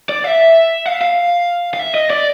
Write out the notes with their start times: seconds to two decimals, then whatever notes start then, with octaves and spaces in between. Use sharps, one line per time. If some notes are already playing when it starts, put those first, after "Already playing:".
0.09 D5
0.24 E5
0.86 F5
1.02 F5
1.74 F5
1.79 E5
1.94 D#5
2.10 D5